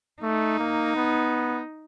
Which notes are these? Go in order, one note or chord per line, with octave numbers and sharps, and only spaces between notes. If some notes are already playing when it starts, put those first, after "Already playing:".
A3 D#4
A#3
B3